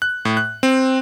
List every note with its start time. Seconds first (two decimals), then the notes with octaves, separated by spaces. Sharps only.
0.02 F#6
0.25 A2
0.37 F#6
0.63 C4